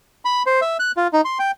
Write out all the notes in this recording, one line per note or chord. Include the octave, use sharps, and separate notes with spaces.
B5
C5
E5
F#6
F4
D#4
C6
G5